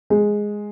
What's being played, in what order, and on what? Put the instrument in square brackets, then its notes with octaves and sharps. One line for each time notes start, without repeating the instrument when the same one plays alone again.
[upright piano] G#3